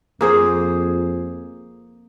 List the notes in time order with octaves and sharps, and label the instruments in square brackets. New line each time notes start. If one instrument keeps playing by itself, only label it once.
[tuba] F2 [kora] A#3 G#4 C5